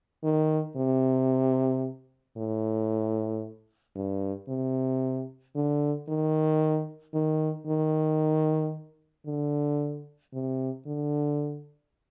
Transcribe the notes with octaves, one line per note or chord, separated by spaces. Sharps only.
D#3
C3
A2
G2
C3
D3
D#3
D#3
D#3
D3
C3
D3